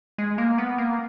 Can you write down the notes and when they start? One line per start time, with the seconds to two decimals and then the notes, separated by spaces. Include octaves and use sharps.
0.18 G#3
0.38 A#3
0.58 B3
0.78 A#3